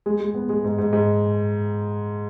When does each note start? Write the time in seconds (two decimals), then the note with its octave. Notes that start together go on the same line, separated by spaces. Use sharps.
0.06 G#3
0.20 G#3
0.35 B3
0.49 G#3
0.64 G#2
0.78 G#2
0.93 G#2